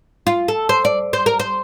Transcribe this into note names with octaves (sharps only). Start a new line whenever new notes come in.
F4
A4
C5
D5
C5
A#4
C5